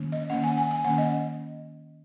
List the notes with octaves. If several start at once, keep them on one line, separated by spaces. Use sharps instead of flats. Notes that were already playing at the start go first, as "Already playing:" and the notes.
Already playing: D#3 A#3 C#4
D#5
D#3 A#3 C#4 F#5
G#5
G#5
G#5
D#3 A#3 C#4 F#5
D#5